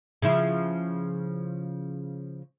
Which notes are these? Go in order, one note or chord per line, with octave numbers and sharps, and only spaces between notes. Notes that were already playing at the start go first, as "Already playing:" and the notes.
C#3 F3 E4